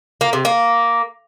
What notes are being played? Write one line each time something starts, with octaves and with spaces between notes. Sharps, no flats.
A#3
C3
A#3